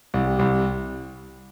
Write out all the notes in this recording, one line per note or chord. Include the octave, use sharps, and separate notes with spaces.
C2
G4
C2